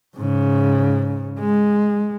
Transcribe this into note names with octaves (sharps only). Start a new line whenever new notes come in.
G#2 C#3
G#3